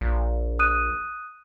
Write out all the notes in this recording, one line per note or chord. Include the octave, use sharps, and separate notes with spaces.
A#1
D#6 F#6 D#7